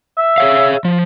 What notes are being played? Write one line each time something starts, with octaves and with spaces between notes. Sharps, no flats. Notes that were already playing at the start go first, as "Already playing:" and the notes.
E5
G#4 C#5 F5
F3